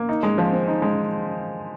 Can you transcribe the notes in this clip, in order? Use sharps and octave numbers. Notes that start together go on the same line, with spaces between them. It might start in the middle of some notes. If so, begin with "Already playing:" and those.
Already playing: A#3
D#4
G#3
F3
C4
D#4
G#3